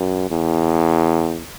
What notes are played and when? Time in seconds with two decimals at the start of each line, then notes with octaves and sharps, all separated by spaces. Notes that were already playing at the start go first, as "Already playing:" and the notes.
Already playing: F#2
0.30 E2